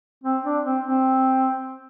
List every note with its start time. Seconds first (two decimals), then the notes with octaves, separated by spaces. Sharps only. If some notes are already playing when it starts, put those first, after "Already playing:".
0.24 C4
0.45 D4
0.64 C4
0.84 C4